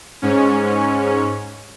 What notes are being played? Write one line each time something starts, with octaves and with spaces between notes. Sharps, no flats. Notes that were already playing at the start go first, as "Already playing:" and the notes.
G#2 C#4